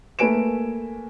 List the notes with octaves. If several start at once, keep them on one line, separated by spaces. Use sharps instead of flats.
A3 A#3 B4 G#5 D7 E7